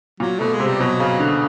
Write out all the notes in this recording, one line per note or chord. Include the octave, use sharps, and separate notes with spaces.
A#2 F#3
B2 A3
G#3
C3
G3
B2 F#3
C#3
D3